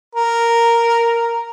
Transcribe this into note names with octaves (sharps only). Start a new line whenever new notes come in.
A#4